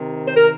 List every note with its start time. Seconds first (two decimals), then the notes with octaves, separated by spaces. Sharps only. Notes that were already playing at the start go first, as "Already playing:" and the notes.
Already playing: C3 D#3
0.27 C5
0.36 A#4